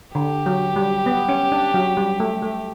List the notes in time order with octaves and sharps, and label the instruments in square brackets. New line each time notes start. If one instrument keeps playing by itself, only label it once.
[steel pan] D3 [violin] G4
[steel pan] F#3
G3
B3
C#4
D4
F#3
G3
A3
A3